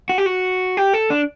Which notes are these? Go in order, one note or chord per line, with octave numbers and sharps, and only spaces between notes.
F#4
G4
F#4
G4
A4
D4